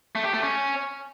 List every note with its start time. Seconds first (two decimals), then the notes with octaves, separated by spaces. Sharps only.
0.15 A3
0.24 G4
0.34 A3
0.43 C#4